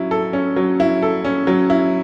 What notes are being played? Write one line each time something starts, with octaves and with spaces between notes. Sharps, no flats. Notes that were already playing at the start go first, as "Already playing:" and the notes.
Already playing: F#3 C#4 E4
A4
C#4
F#3
E4
A4
C#4
F#3
E4